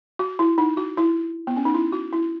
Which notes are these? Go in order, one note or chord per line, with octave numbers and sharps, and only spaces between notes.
F#4
E4
D#4
F#4
E4
B3
C#4
D#4
E4
F#4
E4